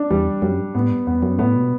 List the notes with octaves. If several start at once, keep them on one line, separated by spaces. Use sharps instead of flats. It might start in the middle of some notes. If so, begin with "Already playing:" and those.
Already playing: D4
E2 G3
F#2 G3
G2
A2 B3
G2
E2 B3
F#2
A2 B3
B2